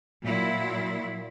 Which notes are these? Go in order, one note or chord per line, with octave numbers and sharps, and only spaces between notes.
A#2 F#3 E4